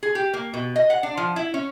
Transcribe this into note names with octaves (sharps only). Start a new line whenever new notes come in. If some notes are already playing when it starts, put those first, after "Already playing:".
G#4
G4
A#3
B2
D#5
F#5
D4
F3
E4
C#4